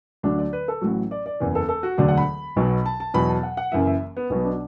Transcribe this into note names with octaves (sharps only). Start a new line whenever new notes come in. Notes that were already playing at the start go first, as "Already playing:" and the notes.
D2 D3 F#3 D4
D5
B4
A4
A1 A2 F#3 F#4
D5
D5
F#1 E2 E3
A4
A4
F#4
E1 D2 D3 F#3 D5
F#5
B5
B1 B2 F#3
A5
A5
E2 B2 F#3 B5
A5
F#5
F#5
F#1 F#2 E3 E5
E5
B3
B1 B2 F#3 B3
D4